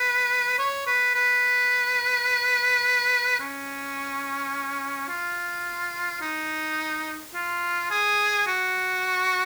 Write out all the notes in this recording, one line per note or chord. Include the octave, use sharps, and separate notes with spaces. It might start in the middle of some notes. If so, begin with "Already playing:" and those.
Already playing: B4
C#5
B4
B4
C#4
F4
D#4
F4
G#4
F#4